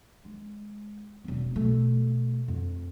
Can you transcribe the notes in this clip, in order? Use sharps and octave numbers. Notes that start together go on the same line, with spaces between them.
G#3
E1 C4
B2 A3
F2